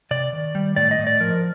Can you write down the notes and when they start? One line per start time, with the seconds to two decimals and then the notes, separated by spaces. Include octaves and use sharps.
0.11 C3 D5
0.33 D#3
0.55 G3
0.76 A2 D5
0.91 D#5
0.99 A2
1.07 D5
1.20 F3 A#4